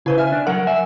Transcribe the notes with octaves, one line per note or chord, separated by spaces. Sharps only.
C#3 E4 B4 C5
E5 G#5 F6
D4
F#3 A#4 F#5
E5 G#5